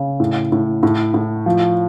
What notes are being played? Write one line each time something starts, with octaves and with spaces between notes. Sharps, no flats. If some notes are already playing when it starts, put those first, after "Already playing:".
Already playing: C#3
A2
A2
A2
A2
F3